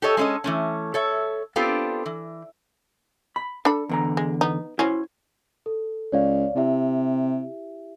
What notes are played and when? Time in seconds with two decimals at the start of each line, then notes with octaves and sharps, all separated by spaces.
0.02 G4 A4 C#5 D#5
0.17 G#3 A3 C#4 A4 D#5
0.44 E3 A3 C#4
0.94 A4 C#5 E5
1.56 B3 C4 D4 F4 G4 A4
2.06 E3
3.36 B5
3.65 D4 A4 B5
3.89 E2 D3 A#5
4.17 G#3
4.41 B3 D#4
4.79 F#3 C#4 E4 C5
5.66 A4
6.12 C#2 C#5 D5 F5
6.56 C3 E4 G4 E5